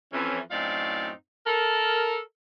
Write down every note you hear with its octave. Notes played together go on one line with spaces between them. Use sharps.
F2 E3 C#4
F#2 A2 C4 D#4 D5 F5
A4 A#4